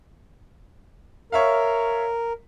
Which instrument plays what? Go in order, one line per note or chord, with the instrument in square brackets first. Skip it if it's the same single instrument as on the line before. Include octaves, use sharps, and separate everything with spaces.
[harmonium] A#4 [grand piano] C#5 E5 F5